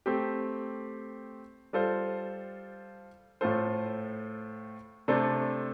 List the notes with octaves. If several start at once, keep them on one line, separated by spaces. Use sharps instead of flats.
A3 C4 G4
G3 F4 A4 C5
A2 A3 F4 A4 C5
C3 A3 D4 A4 C5